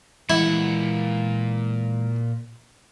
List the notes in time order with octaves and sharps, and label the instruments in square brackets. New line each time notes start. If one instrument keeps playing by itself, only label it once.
[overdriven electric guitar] A#2 F#5 [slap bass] E3 G#3 [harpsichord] E4 E5